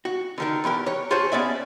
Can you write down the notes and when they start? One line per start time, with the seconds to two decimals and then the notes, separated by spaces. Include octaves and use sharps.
0.05 F#4
0.38 D3 D#3 A#4
0.64 E2 E3 G4 A#4
0.86 C#5
1.11 F4 F#4 G#4 A4 C5 C#5
1.32 B3 C#4 D5 E5